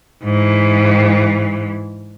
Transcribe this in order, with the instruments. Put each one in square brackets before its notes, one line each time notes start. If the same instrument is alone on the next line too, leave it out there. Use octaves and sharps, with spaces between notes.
[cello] G#2 E3